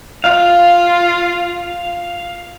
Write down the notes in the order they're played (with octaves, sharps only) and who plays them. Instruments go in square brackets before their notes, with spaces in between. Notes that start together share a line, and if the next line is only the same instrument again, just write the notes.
[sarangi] F4 [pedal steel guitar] F5